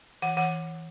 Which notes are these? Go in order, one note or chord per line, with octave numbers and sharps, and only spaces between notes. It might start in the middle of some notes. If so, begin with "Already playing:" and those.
E3 F#5
E3 F#5